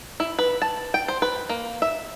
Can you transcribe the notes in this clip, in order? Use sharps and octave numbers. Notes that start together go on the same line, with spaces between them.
E4
B4
A5
G5
C5
B4
A#3
E5